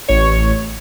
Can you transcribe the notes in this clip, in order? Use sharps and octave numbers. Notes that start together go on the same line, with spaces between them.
A1 C#5